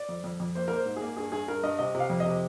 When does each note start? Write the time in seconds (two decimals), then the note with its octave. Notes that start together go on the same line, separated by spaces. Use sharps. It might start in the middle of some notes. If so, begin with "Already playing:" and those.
Already playing: D5
0.09 F2
0.24 F2
0.40 F2
0.55 A#3 C5
0.68 A#4
0.71 A#3 C5
0.86 G#2
0.96 G#4
1.02 A#3
1.17 G2 G#4
1.32 G2 G#4
1.48 G2 A#4
1.63 G2 D#5
1.79 C3 D#5
1.95 C3
2.00 F5
2.10 F2
2.20 D#5
2.26 C3